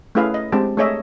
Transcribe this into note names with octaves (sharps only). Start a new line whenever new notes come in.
A3 C#4 E4 G#4 B4 F5
D#5
G#3 C4 D4 G4 A5
A3 D4 G#4 C#5 D#5 E5